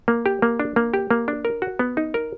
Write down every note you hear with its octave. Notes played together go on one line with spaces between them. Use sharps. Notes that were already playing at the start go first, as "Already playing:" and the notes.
A#3
G4
A#3
D4
A#3
G4
A#3
D4
A#4
F#4
B3
D#4
A#4